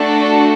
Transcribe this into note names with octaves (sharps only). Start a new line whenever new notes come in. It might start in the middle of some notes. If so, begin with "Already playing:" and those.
Already playing: A3 D4 F#4 A4